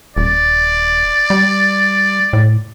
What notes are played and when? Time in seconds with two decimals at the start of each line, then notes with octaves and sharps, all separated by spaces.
0.16 D#1 D5
1.30 G3
2.33 A2